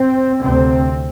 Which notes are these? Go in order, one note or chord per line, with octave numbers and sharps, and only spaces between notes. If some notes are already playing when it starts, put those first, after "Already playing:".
Already playing: C4
D2 C3 C4